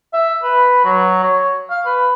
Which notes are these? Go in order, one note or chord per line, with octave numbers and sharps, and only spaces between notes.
E5
B4
F#3
C#5
F5
B4